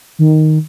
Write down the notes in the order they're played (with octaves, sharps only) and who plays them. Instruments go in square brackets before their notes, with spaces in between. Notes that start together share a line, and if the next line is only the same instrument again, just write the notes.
[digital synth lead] D#3